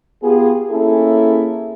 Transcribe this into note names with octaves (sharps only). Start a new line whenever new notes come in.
B3 F4 G4 G#4
A#3 C#4 E4 G#4 A4